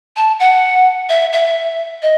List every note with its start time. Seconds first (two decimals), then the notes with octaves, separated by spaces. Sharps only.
0.16 A5
0.39 F#5
1.09 E5
1.32 E5
2.02 D#5